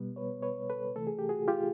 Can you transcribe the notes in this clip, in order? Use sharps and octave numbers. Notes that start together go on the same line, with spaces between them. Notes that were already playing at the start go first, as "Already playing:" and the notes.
Already playing: B2 G3 B3
B4 C#5
B4 C#5
A4 B4
C3 E3 A3 A4
G#4
G4
F#4 G#4
F4 G4